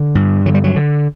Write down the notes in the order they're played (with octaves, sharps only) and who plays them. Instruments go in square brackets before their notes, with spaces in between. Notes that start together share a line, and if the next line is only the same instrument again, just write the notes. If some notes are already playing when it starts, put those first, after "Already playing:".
Already playing: [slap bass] D3
G2
D3 F#3
G3
F#3
D3